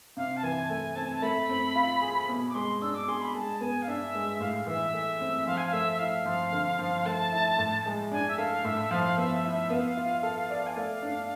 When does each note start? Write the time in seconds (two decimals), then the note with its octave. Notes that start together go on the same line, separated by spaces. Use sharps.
0.17 C3 F5
0.37 A5
0.43 E3 G#5
0.63 A5
0.69 A3 G#5
0.96 C4 A5
1.05 G#5
1.15 A5
1.22 A3 B5
1.49 C4
1.75 F4
2.02 G#4
2.29 B2 B5
2.49 D6
2.55 G#3 C6
2.82 D4 E6
2.95 D6
3.08 G#4 C6
3.21 B5
3.34 G#3 A5
3.61 B3 G#5
3.82 F5
3.88 D4 E5
4.15 G#3
4.40 A2 F5
4.67 E3 E5
4.93 A3 E5
5.20 C4
5.47 F3 F5
5.57 G#5
5.66 F5
5.73 A3 E5
5.92 E5
5.99 E4 F5
6.26 F3
6.52 D3
6.79 F3
7.06 A3 A5
7.32 E4
7.59 A2
7.86 G#3
8.12 D4 G#5
8.28 E5
8.38 A4 F5
8.65 A2 E5
8.90 F3 F5
9.17 B3 E5
9.44 E4
9.70 B3 F5
9.97 F4
10.23 A4
10.50 D5
10.67 G#5
10.77 A3 F5
11.03 D4